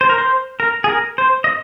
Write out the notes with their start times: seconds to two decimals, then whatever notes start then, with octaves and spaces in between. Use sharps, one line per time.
0.01 C5
0.09 A#4
0.18 C5
0.60 A#4
0.84 G#4
0.89 A#4
1.18 C5
1.44 D#5